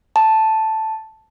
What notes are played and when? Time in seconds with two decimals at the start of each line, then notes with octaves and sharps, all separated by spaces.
0.16 A5